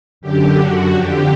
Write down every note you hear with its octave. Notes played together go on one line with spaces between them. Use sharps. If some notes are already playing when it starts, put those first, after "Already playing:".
F#2 D3 G4
F#4
F2 D3 G4